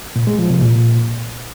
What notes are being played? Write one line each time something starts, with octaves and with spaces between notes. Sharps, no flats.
A#2
G#3
F3
C3
A#2